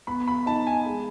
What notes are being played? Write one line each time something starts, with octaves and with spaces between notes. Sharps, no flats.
B3 B5
B5
D#4 A5
G#5
G#3